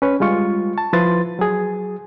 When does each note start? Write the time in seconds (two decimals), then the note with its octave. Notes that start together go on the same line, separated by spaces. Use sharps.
0.02 C#4 B4 C#5
0.20 G3 G#3 F4 C#6
0.78 A5
0.93 F3 E4 B4 C6 A6
1.39 F#3 G#4